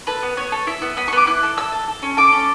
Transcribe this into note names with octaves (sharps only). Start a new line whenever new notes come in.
A4 B4
B3
B3 C#5
A4
E4 E5
B3
B3 B5
C#6
B3 D6
E4 F#6
A4
A4 E6
A4
A4
C#4
A4 D6
C#4